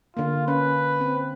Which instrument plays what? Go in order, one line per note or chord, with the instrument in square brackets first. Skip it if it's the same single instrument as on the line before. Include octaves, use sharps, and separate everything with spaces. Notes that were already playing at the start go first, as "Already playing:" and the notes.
[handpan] D3 A#3 [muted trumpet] F4
[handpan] C#4 [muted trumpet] B4
[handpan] C4